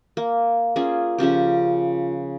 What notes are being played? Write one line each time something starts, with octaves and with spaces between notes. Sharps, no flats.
A#3
A#3 C#4 F4 G#4
C#3 F3 C#4 G4